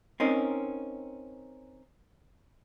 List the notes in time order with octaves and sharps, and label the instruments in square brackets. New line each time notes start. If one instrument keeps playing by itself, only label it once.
[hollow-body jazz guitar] C4 C#4 D#4 A#4